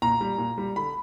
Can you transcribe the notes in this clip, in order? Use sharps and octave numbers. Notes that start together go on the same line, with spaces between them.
A#2 A#5
G3
A#2
G3
D3 B5